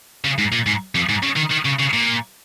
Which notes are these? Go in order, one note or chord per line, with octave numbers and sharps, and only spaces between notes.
C#3
G#2
A#2
G#2
F2
G#2
C#3
D#3
D#3
C#3
C#3
A#2